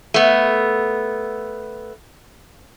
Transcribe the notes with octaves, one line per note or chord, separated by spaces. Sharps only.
A3 B3